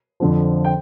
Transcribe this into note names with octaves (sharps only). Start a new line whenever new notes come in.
F2 D3 F3
G5